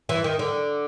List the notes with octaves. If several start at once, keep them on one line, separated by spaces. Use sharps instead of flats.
E3
D#3
D3